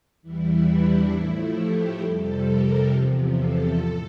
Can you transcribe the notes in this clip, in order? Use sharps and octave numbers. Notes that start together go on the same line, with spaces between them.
E2 E3 G3 E4
D4
A2 F3 A3 E4
G4
F2 C3 G3 A4
A#4
E2 C3 F3
A4
A2 A4